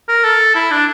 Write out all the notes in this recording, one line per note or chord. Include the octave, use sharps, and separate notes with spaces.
A#4
A4
E4
D4